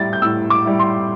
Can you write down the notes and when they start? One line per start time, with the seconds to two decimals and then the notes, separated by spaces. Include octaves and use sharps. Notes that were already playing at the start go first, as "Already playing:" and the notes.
Already playing: A2 G3 E4 A6
0.13 G6
0.22 A2 E6
0.50 D6
0.65 G3 E4
0.79 C6